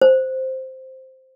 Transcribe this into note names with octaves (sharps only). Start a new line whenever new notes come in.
C5